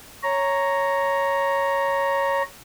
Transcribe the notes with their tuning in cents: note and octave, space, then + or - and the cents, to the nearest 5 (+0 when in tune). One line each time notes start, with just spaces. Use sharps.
C#5 +0 A#5 +0